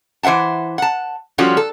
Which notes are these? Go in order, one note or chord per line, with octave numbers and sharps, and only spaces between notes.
E3 C5 E5 F#5 A5
F#5 A5
F3 G3 C#4 F4 F#4 A4
A4